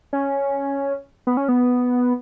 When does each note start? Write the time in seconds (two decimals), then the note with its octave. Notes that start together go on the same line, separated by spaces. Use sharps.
0.13 C#4
1.27 B3
1.37 C#4
1.48 B3